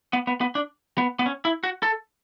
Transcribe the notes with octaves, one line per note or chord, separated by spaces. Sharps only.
B3
B3
B3
D4
B3
B3
C#4
E4
F#4
A4